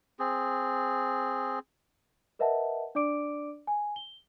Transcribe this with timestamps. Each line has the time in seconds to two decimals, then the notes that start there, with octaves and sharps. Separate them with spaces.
0.19 C4 G#4
2.39 A#4 B4 D#5 E5 F#5 A5
2.95 D4 D5 D6 D7
3.67 G#5
3.96 G7